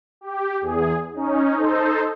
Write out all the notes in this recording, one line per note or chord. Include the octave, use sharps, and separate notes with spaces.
G4
E2 G#4
C#4 D#4
D#4 A4 C5